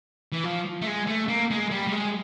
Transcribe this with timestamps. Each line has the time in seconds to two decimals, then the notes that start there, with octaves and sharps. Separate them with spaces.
0.32 E3
0.44 F3
0.82 A3
0.87 G#3
1.07 A3
1.28 A#3
1.51 G#3
1.71 G3
1.87 G3
1.92 G#3